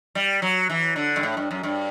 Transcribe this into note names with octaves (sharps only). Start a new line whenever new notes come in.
G3
F#3
E3
D3
G2
A2
G2
F#2
G2